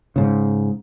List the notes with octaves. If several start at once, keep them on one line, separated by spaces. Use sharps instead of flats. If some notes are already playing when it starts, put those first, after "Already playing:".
G#2 C#3